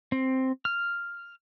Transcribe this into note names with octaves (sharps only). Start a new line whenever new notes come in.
C4
F6